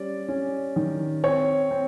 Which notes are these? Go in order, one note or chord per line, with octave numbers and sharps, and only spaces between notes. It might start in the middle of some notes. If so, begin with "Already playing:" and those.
Already playing: G3 C#4 D5
C#4
D#3
C4 C#5
C4